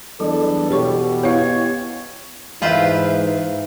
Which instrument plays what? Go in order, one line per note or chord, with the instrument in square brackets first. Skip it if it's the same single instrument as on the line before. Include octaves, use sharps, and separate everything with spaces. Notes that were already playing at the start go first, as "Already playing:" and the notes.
[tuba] E2 [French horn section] E3 D4 A4 [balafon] F#3 G3
[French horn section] B2 [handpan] G4 [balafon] A4 C#5 C#6
[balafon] B3 E4 F5 [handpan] C#5
[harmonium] G#2 E3 [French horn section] D#4 [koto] F4 B4 C5 [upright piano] E5 F5